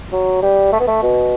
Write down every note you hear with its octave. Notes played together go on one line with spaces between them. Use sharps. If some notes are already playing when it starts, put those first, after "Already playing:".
F#3
G3
A3
B3
A3
B2